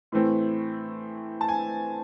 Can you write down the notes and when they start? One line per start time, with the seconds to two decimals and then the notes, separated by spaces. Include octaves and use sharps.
0.12 A2 E3 A3 C4
1.41 A5
1.48 G#5